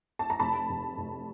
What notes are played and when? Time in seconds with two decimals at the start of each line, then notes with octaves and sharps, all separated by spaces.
0.19 A5
0.30 A#5
0.39 F1 A5 B5
0.69 F1
0.98 F1